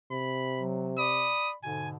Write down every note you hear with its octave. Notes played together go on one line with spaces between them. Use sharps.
C3 B5
F#3
D5 B5 D#6
G#2 B2 D3 G#5